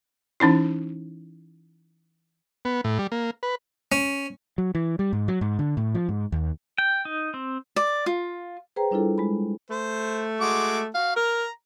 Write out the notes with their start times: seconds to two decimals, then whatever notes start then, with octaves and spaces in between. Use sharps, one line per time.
0.40 E3 C#4 D#4 E4
2.65 B3
2.84 A2
2.99 G3
3.12 A#3
3.43 B4
3.92 C#4
4.58 F#3
4.75 E3
4.99 G3
5.13 G#2
5.28 F#3
5.41 G#2
5.59 D3
5.77 A2
5.95 F3
6.09 G#2
6.32 D#2
6.78 G5
7.05 D#4
7.34 C4
7.76 D5
8.06 F4
8.76 G#4 B4 C5 G5 A#5
8.91 G3 D4 E4 F4 A4
9.18 G#3 B5
9.70 A3 C5
10.41 G#3 F#4 D6
10.95 F#4 F5
11.16 A#4 A#5